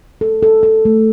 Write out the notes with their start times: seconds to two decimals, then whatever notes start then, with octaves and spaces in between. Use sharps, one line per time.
0.21 A4
0.43 A4
0.63 A4
0.85 A3